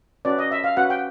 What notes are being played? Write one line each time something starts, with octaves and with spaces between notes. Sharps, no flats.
C#4 F#4 B4 D5
D#5
E5
F5
C#4 F#4 B4 F#5
G5